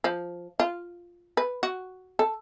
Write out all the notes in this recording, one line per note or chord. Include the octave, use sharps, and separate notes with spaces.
F3
F4
B4
F#4
A4